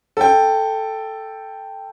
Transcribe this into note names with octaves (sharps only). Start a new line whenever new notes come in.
A4 G5